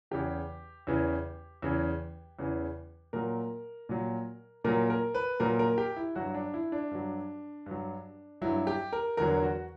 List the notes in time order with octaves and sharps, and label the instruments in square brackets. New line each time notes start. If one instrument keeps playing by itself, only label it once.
[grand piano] E2 C#3 E3 G4
E2 C#3 E3
E2 C#3 E3
E2 C#3 E3
A#2 F#3 A#4
A#2 F#3
A#2 F#3 A#4
A#4
B4
A#2 F#3 A#4
A#4
G4
E4
G2 F#3 F#4
D4
E4
D4
G2 F#3
G2 F#3
G2 F#3 E4
G4
A#4
E2 D3 F#3 A#4
F#4